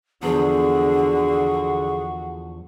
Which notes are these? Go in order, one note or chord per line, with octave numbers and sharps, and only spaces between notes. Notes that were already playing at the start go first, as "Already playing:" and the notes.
E2 D3 F3 F#4 G#4